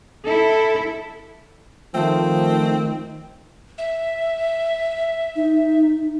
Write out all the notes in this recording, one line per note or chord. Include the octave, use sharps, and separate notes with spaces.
E4 A4
D#3 F3 A3 C4
E5
D#4